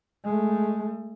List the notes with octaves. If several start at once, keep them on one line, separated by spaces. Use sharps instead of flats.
G#3 A3